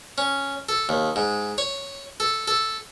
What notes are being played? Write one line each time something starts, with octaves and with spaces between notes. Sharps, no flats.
C#4
A4
D#2
G#2
C#5
A4
A4